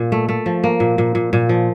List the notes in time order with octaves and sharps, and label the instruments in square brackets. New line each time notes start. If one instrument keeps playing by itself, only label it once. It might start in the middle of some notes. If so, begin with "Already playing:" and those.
Already playing: [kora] A#2
A3
A3
F3
A#3
A#2
A#2
A#2
A#2
F3